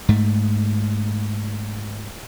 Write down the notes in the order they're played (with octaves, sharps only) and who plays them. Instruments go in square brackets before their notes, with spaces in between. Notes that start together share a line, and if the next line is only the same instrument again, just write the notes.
[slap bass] G#2 A3